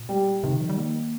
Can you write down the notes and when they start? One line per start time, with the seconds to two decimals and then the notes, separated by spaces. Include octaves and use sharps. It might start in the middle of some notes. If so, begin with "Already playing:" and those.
Already playing: A#2
0.09 G3
0.43 C3 D#3
0.52 D3
0.60 F3
0.69 G3
0.78 A#3